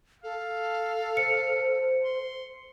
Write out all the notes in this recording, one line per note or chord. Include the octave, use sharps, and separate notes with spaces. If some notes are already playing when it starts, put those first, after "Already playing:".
A4 F5
C5 C#7
C6